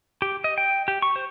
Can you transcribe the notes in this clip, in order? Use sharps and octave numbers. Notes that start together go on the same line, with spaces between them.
G4
D#5
G5
G4
C#6
C5